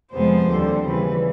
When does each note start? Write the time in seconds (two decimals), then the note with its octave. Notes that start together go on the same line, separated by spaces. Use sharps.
0.13 F2 C3 F3 G#3 B3 C5
0.49 D#2 D3 G3 C4
0.86 C#3 E3 G3 B4